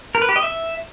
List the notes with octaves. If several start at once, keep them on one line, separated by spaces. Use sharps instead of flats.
A#4
B4
G4
D#5
E5